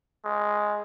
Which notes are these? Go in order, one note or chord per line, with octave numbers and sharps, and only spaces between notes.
G#3